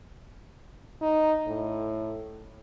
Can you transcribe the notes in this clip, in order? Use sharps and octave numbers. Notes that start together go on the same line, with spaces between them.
D#4
A2